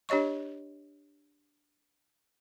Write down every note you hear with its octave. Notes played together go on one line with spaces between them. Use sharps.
D4 G4 C#5 D#5 C#6